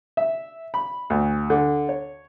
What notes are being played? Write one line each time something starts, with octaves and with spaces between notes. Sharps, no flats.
E5
B5
D2
D3
C#5